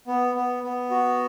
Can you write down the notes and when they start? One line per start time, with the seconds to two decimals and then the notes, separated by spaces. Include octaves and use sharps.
0.07 B3
0.35 B3
0.63 B3
0.91 F#4